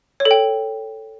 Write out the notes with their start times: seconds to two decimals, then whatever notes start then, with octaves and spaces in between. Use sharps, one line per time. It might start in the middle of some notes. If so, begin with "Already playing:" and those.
0.20 C#5
0.25 A4
0.31 G5